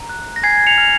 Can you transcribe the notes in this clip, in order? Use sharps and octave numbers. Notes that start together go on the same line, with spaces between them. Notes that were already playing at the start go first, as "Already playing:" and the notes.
Already playing: A#5
F#6
A#6
G#5 G#6 C7
C#7 F7
F6